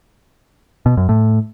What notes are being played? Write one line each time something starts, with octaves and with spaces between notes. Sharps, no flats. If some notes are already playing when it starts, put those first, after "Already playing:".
B2
F#2
A2